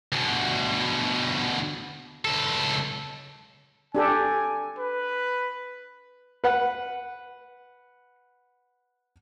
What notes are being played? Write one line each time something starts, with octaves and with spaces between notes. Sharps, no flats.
D2 B2
C#2 A4
D4 G4 A4 G#5
B4
B4 F#5